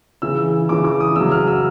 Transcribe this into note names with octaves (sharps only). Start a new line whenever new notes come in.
C#3 E3 E6
C#3 E3 D6
D6
D#6
C#3 F#3 E6
F6
E6